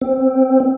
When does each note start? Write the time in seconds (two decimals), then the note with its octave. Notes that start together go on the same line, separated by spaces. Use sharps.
0.01 C4